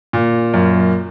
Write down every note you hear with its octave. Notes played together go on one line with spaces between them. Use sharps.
A#2
F#2